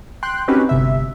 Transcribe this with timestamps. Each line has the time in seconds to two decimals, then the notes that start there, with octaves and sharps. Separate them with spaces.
0.23 G5 C6 F#6
0.48 C4 C#4 D#4 F#4 G4 B4
0.69 G1 C3 E5